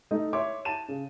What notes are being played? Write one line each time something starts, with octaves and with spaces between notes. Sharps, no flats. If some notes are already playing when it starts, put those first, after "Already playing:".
A3 D#4 D#5
C#5 E5 C6 D6
A5 D#7 E7
C#3